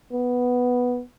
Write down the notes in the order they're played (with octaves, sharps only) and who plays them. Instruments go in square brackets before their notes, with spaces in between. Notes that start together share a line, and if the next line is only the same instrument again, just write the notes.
[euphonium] B3